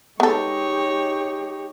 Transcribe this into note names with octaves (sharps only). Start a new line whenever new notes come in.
G#3 B3 D#4 G4 A4 C#5